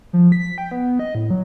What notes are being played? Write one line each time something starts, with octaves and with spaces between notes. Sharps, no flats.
F3
B6
G5
B3
D#5
A2
F#3